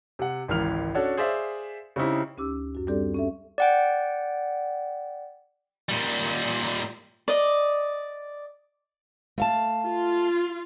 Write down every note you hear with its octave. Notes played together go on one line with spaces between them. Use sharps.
C3 F#5
G#1 C#2 E3 A#4 F6 F7
C#4 D4 F#4 A4 C#5
G#4 C5 D5 E5 F5
C#3 C4 C#4 D#4 E4 G4
D2 C#4 D#4 G4 D6 E6
F#2 F#4
G3 C4 D4 G4 A4 D5
C#4 A4 E5
D5 F#5 G5
A#2 G3
D5 D#5
A3 F5 A5
F4